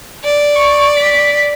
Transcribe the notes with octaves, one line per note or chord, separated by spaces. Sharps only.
D5
C#6
B6